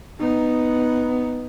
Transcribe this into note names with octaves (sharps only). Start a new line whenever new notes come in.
B3 D#4